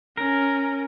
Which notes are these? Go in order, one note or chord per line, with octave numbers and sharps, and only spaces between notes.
C#4 A#4